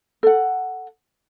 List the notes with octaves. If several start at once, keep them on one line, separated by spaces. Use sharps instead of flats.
A4 F#5